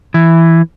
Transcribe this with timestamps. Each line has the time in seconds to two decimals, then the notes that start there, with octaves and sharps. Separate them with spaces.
0.14 E3